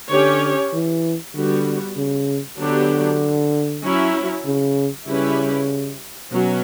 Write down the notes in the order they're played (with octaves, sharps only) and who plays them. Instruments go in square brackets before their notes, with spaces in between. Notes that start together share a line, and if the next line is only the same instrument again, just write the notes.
[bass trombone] D3 [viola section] C#4 G4 C#5
[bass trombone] E3
[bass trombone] D3 [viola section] G3 B3 F#4
[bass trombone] C#3
[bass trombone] D3 [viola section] F#3 B3 D4 G4
[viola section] F#3 C#4 E4
[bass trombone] C#3
[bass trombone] C#3 [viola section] G3 C#4 E4 G4 B4
[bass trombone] B2 [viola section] F#3 C#4